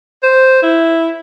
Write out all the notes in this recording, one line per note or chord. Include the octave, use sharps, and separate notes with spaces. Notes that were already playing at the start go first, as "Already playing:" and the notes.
C5
E4